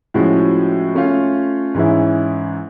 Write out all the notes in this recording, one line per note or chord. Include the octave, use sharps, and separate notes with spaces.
A2 F3 G#3 C#4 F#4
A3 C#4 F4
G#2 E3 G#3 C#4 E4